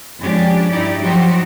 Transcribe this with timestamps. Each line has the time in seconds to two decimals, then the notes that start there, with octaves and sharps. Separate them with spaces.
0.19 F2 G#3 C#4 D4 G4
0.69 G2 D#4 E4 G4 D5
1.01 F3 F#3 D#4 F#4 G4 C5